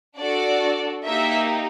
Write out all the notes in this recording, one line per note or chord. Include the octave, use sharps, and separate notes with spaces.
D4 F#4 A4 D5
A#3 D#4 G4 E5